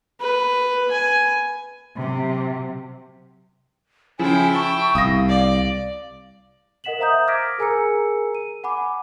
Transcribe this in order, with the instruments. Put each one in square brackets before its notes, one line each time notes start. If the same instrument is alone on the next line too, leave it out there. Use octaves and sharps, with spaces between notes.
[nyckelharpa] B4
G#5
[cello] C3 F#3
[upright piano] C#3 F3 [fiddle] E4 G5 [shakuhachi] G#5
[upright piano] A5 [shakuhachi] C#6
[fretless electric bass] C2 [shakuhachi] F5 [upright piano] D#6 A#6
[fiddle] D5
[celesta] A#4 D#5 F#5 B6 E7 F#7
C5 E5 F5 A#5 D#6 G6
D6 F6 G#6 A#6 B6 D7
G#4 A#4 G#5 A#5 E6 C#7
D#7
F#5 G#5 B5 D6